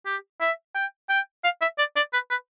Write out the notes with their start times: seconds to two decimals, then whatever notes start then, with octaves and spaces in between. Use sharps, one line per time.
0.06 G4
0.41 E5
0.75 G5
1.09 G5
1.44 F5
1.62 E5
1.78 D5
1.96 D5
2.13 B4
2.30 B4